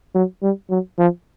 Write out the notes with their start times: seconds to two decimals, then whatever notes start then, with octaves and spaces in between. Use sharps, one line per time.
0.15 F#3
0.42 G3
0.70 F#3
0.99 F3